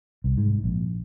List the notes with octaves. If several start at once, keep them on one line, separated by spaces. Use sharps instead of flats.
C2
G#2
A#1